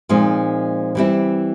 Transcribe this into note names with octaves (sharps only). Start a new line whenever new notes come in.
A#2 F3 G#3 C4 D#4
E3 G3 C4 E4